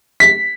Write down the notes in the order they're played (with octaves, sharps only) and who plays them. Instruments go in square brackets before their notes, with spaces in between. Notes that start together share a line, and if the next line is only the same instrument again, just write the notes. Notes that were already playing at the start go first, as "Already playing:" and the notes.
[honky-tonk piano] B6